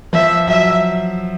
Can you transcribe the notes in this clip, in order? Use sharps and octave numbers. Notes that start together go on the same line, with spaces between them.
F3 E5
F#3 E5